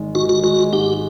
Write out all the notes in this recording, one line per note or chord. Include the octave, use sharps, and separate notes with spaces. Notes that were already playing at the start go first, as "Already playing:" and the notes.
Already playing: G#1 D#3 G#3
D#3 F#4
F#4
G#3 F#4
G#2 G4